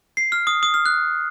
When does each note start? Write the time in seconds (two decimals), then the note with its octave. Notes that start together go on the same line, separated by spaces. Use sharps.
0.17 C7
0.32 F6
0.47 D#6
0.63 D#6
0.74 F6
0.86 F#6